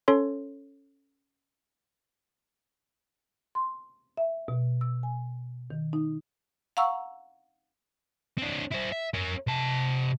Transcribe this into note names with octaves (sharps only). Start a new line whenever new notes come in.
C#4 A4 C#5 C6
C6
E5
B2
E6
G#5
D#3
D#4
F5 F#5 A#5 C#6 E6
C4 D4
E4 C5
E5
C#4 A#4
C3 A5